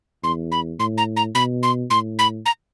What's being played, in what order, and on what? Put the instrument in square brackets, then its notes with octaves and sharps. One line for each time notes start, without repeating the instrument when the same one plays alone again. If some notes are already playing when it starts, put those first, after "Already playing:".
[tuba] E2 [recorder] C6
[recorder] B5
[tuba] A2 [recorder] C6
[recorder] A#5
A#5
[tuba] B2 [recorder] B5
[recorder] C6
[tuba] A2 [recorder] C6
[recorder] B5
A#5